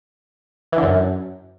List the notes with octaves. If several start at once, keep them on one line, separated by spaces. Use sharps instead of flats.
E3
D3
F#2